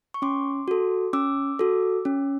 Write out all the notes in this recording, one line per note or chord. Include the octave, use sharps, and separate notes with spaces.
C#6
C#4 C6 D6
F#4 A4
C#4 D6 E6
F#4 A4
C#4